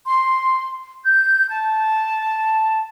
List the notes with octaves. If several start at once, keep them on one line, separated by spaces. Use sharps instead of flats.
C6
G6
A5